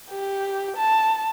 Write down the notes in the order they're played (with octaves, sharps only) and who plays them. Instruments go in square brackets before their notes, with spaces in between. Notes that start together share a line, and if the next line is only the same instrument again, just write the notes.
[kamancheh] G4
A5